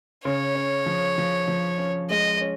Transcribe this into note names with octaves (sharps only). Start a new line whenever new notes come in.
C#3 C#5
C#4
F3
F3
F3
C#4
G#3 D#5
C#4